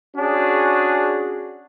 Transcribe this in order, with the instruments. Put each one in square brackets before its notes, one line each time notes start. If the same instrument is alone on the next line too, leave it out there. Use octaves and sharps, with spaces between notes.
[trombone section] C#4 D4 F#4 G#4